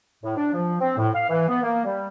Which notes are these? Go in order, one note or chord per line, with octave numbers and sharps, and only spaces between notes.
A2
D4
F3
C4
A2
F5
E3
B3
A#3
G3